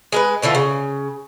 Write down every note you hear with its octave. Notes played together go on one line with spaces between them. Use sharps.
G#3 A#4 B4
B2 D3 E3 F4
C#3